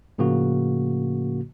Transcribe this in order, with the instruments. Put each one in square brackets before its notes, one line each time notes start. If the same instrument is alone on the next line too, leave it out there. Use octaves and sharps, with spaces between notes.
[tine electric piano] A2 C#3 F3 A#3 F#4